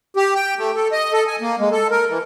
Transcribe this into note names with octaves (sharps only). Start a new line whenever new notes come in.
G4
G5
A3
A4
D#5
A4
G#5
A#3
G#3
A4
A#4
E3